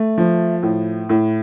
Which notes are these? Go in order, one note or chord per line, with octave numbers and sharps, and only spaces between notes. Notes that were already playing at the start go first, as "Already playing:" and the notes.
Already playing: A3
F3
A2
A2